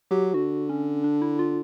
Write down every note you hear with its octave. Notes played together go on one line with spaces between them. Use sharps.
F#3 G4
D3 F#4
C#4
D4
E4
F4